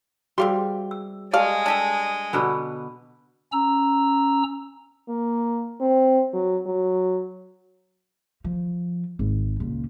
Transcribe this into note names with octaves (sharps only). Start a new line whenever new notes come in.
C3 G3 F#4 G#4 F5 C6 D6
E6
G#3 G4 A4 D5 D#5 F5
D4 G4 A4 D5
B2 D3 B3 A5 B5
C#4 A#5 E6
A#3
C4
F#3
F#3
F3
G#1
C#2 A#2